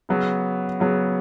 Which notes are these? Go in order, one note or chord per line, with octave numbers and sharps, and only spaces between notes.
C#3 F#3 B3
C#3 F#3 B3